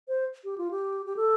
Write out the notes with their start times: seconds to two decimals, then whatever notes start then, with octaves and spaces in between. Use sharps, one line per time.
0.08 C5
0.44 G4
0.58 F4
0.71 G4
1.06 G4
1.16 A4